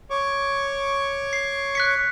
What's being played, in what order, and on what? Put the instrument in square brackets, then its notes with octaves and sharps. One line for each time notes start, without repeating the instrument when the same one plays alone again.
[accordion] C#5 C#6 D6
[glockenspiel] C7
F#6 B6 C#7